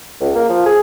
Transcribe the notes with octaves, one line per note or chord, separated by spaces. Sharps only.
C#2
A#3
F3
G#4